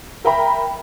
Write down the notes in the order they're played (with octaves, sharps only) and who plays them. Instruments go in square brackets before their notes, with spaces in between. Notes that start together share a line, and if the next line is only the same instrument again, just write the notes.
[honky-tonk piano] A#4 E5 G5 A#5 B5